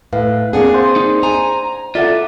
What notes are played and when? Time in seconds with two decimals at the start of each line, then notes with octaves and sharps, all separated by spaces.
0.13 A2 B4 F5
0.53 A#3 C4 D4 G#4 F5 F#5
0.74 C5 F#5 C6
0.96 D#4
1.23 G#5 A#5
1.95 F4 A4 D5 E5 F#5